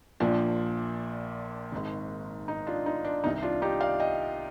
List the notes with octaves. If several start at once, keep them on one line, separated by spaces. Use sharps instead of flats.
A#1 A#2 F3 D4
G#1 G#2 D#3
D#4
D4 F4
D#4
D4
C2 C3 D#3 D#4
D4 F4
D#4 G4
D5 F5
D#5 G5